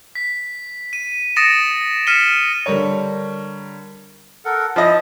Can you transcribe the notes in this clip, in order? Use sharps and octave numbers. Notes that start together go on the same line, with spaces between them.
B6
D#7
D#6 A6 A#6 C#7 D7 E7
F6 B6 C#7 D#7 E7 G7
D3 G3 A#4 C#5
A4 A#4 F#5
F3 E4 D#5